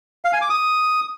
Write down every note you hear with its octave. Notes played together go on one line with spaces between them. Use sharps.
F5
G#5
D6
D#6